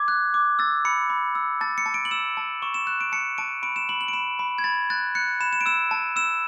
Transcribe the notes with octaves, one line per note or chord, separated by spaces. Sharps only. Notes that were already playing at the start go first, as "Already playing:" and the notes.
Already playing: D6 G#6
F#6
D6
E6 A6
B5 C#7
B5
E6
A5 A6
C#7
A5
D7
F#7
E6 E7
A5
C#6 E7
E7
F#6 E7
D7
A5 C#7
A5 D7
B5 D7
E7
B5 F#7
F#7
D7
B5 E7
B5
G#6
B5 A6
F#6 A6
F#6 C#7
B5 E7
E7
D7
E6 E7
A5
E6 E7